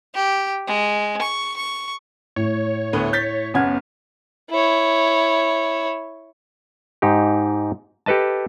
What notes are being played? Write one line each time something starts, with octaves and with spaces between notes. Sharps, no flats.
G4
G#3
C#6
C#6
A2 C#5
D2 A3 B3
G6 A6 B6
F#1 B3 C#4 F#5 F6 G#6
E4 C#5
G#2 D#4 G4
G4 A4 B4 D#5 A5